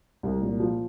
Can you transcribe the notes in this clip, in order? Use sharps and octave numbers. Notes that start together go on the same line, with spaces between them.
C2
A#2
F3